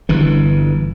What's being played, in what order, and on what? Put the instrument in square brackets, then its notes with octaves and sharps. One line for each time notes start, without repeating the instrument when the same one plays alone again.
[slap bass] G1 G2 E3